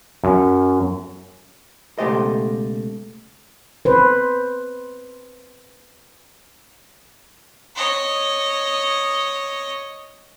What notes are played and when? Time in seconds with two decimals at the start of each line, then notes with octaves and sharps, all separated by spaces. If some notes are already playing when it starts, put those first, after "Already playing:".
0.24 F#2
1.98 C#2 B2 A3 G4 C5 D#5
3.85 B4 C5
7.76 C#5 D#5